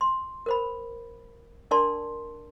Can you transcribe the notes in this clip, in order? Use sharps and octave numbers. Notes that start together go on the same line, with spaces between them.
C6
A#4 C5 B5
D4 A#4 D5 A5 C6